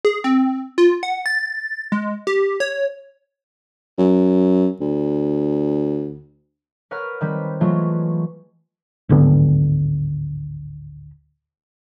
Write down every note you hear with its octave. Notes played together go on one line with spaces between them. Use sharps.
G#4
C4
F4
F#5
A6
G#3
G4
C#5
F#2
D2
A#4 B4 C#5 F#5 F6
D#3 G3 C4 B4
E3 F#3 G#3 A3 B3 F4
D1 G#1 D3 B3